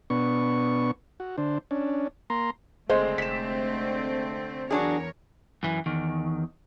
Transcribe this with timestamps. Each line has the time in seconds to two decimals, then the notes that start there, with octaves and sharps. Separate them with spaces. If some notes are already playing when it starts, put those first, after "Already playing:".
0.10 B2 B3 D4 C#6
1.20 F#4
1.38 D3 D4 C5
1.71 C#4 D4
2.30 A#3 A#5 C6
2.89 F#1 D3 G#3 A3 C4 C5
3.18 F1 B6 E7
4.71 E2 F#3 D4 G#4 A#4 C#5
5.63 F#2 E3
5.86 E2 D#3